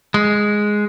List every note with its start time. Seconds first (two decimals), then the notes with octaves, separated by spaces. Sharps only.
0.14 G#3